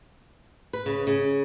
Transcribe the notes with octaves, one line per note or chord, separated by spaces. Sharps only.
B4
C#3
C#3